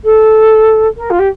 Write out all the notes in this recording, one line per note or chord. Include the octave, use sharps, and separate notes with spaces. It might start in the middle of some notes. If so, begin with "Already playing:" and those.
A4
A#4
F4
G4